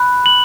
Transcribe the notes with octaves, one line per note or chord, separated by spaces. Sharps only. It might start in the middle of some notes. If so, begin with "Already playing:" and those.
Already playing: B5 F#6
F#7